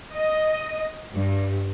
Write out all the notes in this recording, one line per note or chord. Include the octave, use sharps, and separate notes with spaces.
D#5
G2